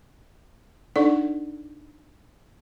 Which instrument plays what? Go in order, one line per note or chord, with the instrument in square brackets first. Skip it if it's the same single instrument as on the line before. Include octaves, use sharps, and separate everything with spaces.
[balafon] D4 D#4 A4 D5 F#5